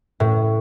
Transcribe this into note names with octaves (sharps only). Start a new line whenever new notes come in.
A2